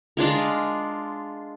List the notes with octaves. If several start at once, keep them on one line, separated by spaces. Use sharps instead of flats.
G#3 D4 F4 A#4